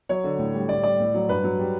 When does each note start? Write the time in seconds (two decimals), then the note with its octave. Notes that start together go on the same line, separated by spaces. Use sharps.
0.09 F#3 C#5
0.24 D3
0.39 A2
0.54 G3
0.69 A2 D5
0.83 G3 D5
1.00 A2
1.14 F#3
1.29 G2 B4
1.44 F#3
1.59 G3